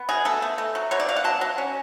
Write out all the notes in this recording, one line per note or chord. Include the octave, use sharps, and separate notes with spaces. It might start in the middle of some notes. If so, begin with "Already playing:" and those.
Already playing: B3
B2 G#4
A3 A4
A3
A3
F#3
B2 C#5
D5
B2 F5
F#5
F#3 A5
F#3
C#4